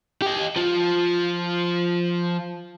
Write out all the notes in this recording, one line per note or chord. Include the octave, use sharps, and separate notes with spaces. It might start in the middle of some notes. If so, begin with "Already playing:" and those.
G4 D#5
F3 F4